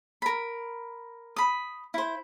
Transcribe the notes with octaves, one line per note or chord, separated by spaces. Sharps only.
A#4 B5
B5 D#6
E4 C5